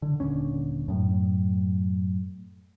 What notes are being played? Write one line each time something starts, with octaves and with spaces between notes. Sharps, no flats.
D3
D#1 C#2 D3 C#4
F#2 A2